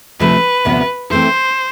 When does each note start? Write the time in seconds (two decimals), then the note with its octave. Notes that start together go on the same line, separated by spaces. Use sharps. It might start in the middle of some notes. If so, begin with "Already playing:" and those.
0.20 D2 C3 F3 A3 B4
0.65 D2 C3 F3 B3
1.10 E3 A3 C4 C5